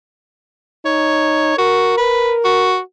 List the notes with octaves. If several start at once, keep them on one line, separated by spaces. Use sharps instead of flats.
D#4 C#5
F#4 A#4
B4
F#4